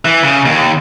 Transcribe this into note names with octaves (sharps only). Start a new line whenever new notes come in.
E3
C#3
D#2